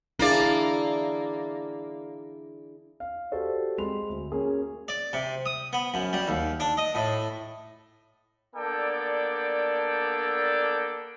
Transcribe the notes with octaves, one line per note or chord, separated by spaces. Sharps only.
A#3 D4 E4 G#4 D5
F5
F#4 G4 A4 C5 D5
G#3 C4 G#4 B5 C6 F7
D2
A#3 C#4 G#4 G#5
D5
C3
D#6
B3
F#2
G3
D#2
D4
D#5
A2
A#3 B3 D4 A4 D5 G5